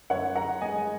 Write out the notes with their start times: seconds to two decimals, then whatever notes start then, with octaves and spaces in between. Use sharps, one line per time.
0.10 F#2 C#5 F#5
0.35 F#2 F#5 A#5
0.61 G#3 D#5 G#5